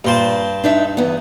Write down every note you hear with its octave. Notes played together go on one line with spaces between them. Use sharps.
G2 A#2 C5 A5
D4 D#4 E5
E2 B3